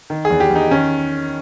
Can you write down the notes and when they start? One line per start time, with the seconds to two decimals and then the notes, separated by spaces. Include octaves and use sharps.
0.10 D#3
0.25 G#4
0.30 E2
0.40 G4
0.50 E2
0.56 D#4
0.71 D#3 C#4